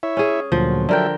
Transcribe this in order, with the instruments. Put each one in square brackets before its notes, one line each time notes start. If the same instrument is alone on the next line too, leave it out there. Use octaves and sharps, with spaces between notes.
[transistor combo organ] E4 C#5 E5
[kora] C#4 G#4
[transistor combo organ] D2 A#2 F#3 [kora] F3
[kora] D3 A#4 G5 [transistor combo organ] F#3 A4 E5